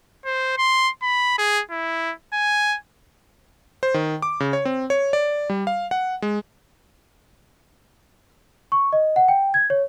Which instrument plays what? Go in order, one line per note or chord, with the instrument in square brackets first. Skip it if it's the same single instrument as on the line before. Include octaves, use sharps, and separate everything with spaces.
[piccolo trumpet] C5
C6
B5
G#4
E4
G#5
[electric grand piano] C5
D#3
D6
C#3
C#5
C4
C#5
D5
G3
F5
F#5
G#3
[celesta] C#6
D#5
F#5
G5
G#6
C#5